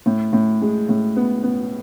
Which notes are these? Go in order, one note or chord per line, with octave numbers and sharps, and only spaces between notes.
A2
A2
G#3
A2
B3
B3